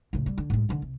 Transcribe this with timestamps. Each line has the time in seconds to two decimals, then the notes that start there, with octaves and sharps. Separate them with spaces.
0.13 A2 C#3
0.26 G3
0.38 D3
0.50 A2 G#3
0.69 D3 D#3
0.82 C2